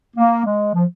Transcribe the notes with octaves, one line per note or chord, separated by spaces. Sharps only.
A#3
G#3
F3